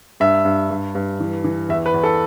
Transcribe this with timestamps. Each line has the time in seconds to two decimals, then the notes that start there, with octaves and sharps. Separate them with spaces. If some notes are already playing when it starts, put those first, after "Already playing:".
0.20 G2 E5
0.45 G2
0.70 G2
0.95 G2
1.20 E3
1.44 E3
1.69 E2 E5
1.86 B4
1.94 E2
2.03 A4